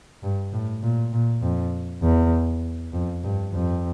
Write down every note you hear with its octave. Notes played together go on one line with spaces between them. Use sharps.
G2
A2
A#2
A#2
F2
E2
F2
G2
F2